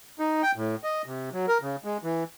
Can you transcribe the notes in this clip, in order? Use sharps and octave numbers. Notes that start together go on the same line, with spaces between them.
D#4
G5
A2
D#5
C3
F#3
A#4
C#3
G#3
E3